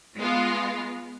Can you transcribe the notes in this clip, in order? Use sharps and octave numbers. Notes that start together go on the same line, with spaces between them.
G#3 B3 F4